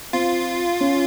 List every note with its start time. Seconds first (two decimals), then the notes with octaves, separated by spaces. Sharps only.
0.13 C4 F4
0.80 C#4